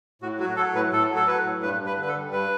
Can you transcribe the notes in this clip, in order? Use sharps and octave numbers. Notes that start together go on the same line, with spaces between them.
A2 F#4
F#3 F#4
F#3 A4
A2 B4
A2 A4
F#3
A4
F#3 B4
A2
G2 B4
G2
B4
D3 B4
A4
G3
G2 B4